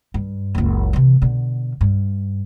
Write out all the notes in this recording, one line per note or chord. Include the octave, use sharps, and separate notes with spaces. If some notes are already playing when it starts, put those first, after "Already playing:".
G2
F#1 C#2
C3 E3
B2 D3
G2